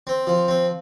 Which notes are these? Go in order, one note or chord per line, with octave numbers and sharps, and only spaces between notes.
C4
F3
C4